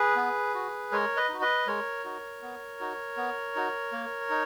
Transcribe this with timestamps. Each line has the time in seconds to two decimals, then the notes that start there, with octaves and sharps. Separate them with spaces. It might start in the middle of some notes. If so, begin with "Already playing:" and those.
Already playing: G#4 B4
0.16 B3
0.54 F#4
0.92 G#3 A#4 C#5
1.17 B4 D#5
1.29 D#4 F#4
1.41 B4 D#5
1.67 G#3 A#4 C#5
2.04 D#4 F#4
2.42 B3
2.80 D#4 F#4
3.17 B3
3.56 D#4 F#4
3.92 A#3
4.30 D#4